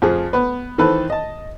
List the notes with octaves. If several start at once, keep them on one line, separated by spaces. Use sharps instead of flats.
F2 F3 G#4
B3 B4
D#3 E3 C4 A4 B4 C5
D#5 A5